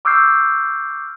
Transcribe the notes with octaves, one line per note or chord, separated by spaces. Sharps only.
C#6 D6 E6 F6 G6 C7